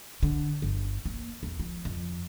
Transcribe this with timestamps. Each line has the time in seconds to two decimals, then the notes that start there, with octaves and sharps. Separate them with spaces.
0.23 D3
0.62 G1
1.06 A#3
1.43 E2
1.60 F3
1.85 F2